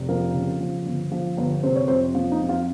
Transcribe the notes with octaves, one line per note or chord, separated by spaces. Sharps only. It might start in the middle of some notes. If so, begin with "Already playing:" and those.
Already playing: F1
F3 A#4
C#3
F3
G1
F3
G1
C3 C5
C#5
F2 C5
F3
D#4
F2
F4